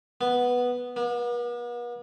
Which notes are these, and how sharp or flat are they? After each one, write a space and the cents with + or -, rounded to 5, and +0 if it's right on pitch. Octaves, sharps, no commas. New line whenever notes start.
B3 -5
B3 -45